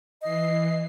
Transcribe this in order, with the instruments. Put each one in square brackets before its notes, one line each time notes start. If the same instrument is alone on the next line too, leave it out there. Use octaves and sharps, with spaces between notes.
[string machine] E3 C7 [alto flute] D#5